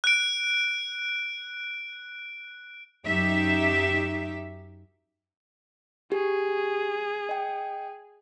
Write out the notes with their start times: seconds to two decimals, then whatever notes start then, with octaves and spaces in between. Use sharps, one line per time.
0.04 F#6 D7
3.06 F#2 D#4 G4 E5
6.12 G4 G#4
7.29 D#5 G5